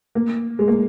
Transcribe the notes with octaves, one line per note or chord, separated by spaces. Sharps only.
A#3
G#3
A#3